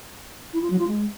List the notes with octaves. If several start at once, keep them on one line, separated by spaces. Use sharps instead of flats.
E4
F4
F#3
F4
G#3